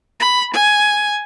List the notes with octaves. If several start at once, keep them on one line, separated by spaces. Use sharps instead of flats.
B5
G#5